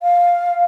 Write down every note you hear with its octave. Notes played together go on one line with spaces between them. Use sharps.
F5